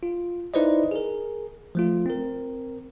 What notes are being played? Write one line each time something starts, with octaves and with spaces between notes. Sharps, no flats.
F4
D#4 E4 B4 C5 D5 D#5
G#4 A#4
F3 A3 F4
C4 A#4